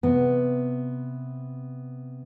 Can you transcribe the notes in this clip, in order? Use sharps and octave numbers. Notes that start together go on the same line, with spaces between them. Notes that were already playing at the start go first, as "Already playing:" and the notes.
C3 B3